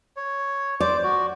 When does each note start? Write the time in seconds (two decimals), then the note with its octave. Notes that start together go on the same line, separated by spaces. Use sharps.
0.16 C#5
0.80 C5 D5 D6
1.03 F#4